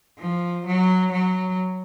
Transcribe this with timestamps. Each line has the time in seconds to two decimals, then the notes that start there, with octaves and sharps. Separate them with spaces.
0.19 F3
0.66 F#3
1.12 F#3